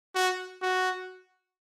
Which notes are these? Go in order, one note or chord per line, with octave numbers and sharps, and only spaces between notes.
F#4
F#4